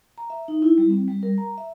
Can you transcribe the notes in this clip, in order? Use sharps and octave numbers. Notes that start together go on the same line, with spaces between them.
A#5
E5
D#4
E4
G3
C4
G3
A#4
A#5
E5